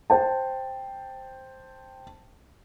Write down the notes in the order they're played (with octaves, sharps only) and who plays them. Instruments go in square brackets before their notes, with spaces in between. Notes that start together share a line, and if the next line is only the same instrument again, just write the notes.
[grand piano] C5 G5 A5